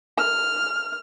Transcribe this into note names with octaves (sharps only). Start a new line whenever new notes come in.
F6